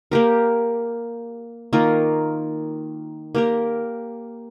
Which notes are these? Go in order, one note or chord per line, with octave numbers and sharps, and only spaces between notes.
A#3 G4 A#4
D#3 A#3 F4 A#4
A#3 G4 A#4